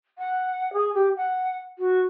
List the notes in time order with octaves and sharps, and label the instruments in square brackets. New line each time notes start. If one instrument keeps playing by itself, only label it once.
[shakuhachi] F#5
G#4
G4
F#5
F#4